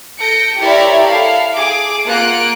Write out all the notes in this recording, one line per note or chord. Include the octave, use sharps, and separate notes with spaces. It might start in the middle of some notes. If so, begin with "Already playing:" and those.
A4 G6 A#6 C#7 D7
E4 G4 A#4 C#5 D5 E5
E4 A4 F5
G#4 D6
A#3 F4 F#5 F#6 D7